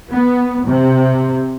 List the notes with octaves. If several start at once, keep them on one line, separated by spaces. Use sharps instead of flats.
B3
C3